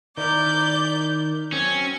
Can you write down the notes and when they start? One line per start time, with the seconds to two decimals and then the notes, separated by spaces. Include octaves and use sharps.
0.17 D#3 E4 A#4 D5 G6
1.52 F#3 C4 C#4 G#6